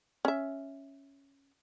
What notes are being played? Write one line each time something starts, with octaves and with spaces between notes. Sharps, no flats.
C#4 E5